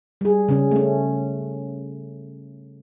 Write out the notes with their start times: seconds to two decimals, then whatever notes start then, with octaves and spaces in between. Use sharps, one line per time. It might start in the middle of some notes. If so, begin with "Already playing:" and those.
0.21 G3 G#4
0.49 C#3 C#4
0.71 A3 C#4